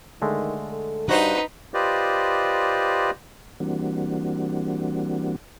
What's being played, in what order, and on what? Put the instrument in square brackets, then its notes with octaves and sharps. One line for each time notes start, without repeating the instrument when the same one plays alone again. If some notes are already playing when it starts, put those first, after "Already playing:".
[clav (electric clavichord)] D3 G#3 A3 [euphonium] D#3
[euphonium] A4
[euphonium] G2 [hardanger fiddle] D#4 B4 [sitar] F#4 C5
[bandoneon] F4 G4 B4 C5 D5 D#5
[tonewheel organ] E3 G3 A#3 C4 D4 F#4